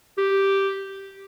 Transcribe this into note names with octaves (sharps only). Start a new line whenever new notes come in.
G4